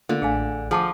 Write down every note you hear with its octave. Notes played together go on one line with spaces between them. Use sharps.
D3 A3 A#3 F4
A1 A3 G#4 F5 G#5
F3 G#4 F#5 A5 D6